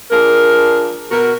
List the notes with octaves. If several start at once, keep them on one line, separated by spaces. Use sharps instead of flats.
F3 D4 G#4 A#4
B2 F#4 A#4